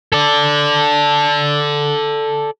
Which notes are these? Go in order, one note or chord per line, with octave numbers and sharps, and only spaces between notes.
A4 D5